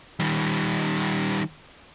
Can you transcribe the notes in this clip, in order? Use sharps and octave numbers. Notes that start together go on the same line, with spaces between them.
D#3 G3